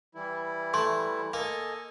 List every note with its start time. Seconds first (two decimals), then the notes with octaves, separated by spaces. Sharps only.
0.15 E3 G3 E4
0.74 A3 C6
1.34 A#3 A4 D#5 G#5